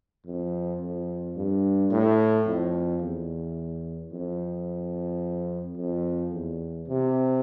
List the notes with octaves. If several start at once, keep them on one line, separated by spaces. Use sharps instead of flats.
F2
F2
G2
A2
F2
E2
F2
F2
E2
C3